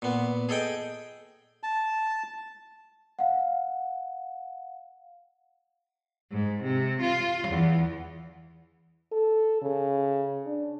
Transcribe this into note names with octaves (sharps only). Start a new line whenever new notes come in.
A#2 B3
G#4 A4 D#5 G5
A5
F5 F#5
G#2
C3
F4
E2
A4
C#3
D4